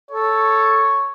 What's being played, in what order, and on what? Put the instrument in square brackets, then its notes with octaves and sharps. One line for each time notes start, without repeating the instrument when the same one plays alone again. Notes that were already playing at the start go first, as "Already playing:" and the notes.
[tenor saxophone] A4 [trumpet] C#5